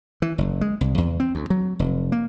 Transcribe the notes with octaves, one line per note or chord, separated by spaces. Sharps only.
E3
F#1
G#3
C2
E2
C4
D2
F#3
F1
A#3